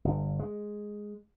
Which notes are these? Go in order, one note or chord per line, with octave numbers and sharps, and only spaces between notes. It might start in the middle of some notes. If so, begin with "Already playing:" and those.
G1
G#3